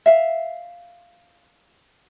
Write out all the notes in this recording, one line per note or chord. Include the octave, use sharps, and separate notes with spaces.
E5 F5